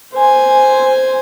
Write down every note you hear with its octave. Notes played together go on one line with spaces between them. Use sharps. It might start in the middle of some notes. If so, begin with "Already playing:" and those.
C5 G#5